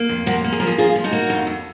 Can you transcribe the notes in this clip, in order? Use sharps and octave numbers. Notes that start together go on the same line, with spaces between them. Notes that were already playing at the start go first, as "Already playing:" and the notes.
Already playing: A#3
F2
F3 F#4 A#4
A#3
G#4
F3 A#4
F4 G#4
F3 F4 G#4
F3
D#4 F#4
A#3
F2
F2